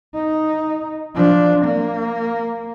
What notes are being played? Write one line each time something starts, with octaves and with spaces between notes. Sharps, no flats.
D#4
F3 D4
A#3